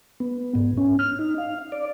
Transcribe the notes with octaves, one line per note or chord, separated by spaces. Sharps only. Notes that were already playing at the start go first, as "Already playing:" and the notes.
B3
G#2
C#4
F6
D#4
F5
D5